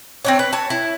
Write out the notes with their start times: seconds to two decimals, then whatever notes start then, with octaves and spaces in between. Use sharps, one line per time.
0.25 C4 D4 C#5
0.39 B4
0.53 C#5 A5
0.70 E4